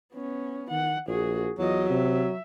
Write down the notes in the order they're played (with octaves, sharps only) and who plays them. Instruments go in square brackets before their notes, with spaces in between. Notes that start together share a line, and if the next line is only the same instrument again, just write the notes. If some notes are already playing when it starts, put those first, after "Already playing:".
[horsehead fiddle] B3 C#4
[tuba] D#3 [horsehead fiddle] F#5
[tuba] A#1 [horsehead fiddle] F#4 G#4
[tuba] E2 [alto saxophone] F#3 [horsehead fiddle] F4 D#5
[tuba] C3 [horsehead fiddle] E5